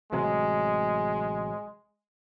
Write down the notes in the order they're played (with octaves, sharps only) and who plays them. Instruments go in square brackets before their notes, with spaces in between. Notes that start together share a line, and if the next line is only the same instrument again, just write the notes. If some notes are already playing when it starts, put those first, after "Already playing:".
[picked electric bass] A1 C3 F#3 [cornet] G#3